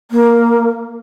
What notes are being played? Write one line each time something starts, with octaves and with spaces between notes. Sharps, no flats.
A#3